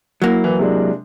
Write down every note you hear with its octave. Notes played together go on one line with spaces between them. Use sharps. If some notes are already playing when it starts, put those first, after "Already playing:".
F#3 A#3 E4
E3
C3 G#3 D4